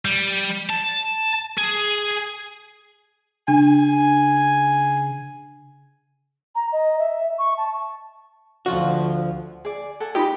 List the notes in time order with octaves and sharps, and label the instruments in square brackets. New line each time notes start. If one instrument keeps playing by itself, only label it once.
[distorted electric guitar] G3
A5
G#4
[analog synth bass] C#3 [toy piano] D4 [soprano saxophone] G#5
[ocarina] A#5
D#5
E5
C#6
A5
[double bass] D2 F3 [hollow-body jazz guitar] F4 F#4
[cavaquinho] G#4 D5
A4 F#5 G#5
[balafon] D#4 F4 [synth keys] G4 [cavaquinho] D#5 B5